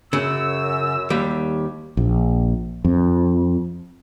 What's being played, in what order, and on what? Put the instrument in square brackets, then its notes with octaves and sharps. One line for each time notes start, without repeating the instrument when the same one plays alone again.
[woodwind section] F#2 E6 [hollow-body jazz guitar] C#3
[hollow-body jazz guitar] D#2 G3
[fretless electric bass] A#1
F2